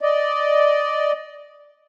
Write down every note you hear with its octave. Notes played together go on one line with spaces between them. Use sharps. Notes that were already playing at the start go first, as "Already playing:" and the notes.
D5 D#5